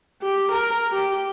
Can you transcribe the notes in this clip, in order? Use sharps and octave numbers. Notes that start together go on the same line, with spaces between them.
G4
A#4
G4